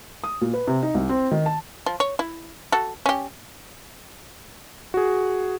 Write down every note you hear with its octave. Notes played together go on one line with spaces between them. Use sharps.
D#6
A#2
B4
C3
D#4
C2
C4
D#3
A5
F3
C#5
E4
F#4 A4
C#4 G4
F#4 G#4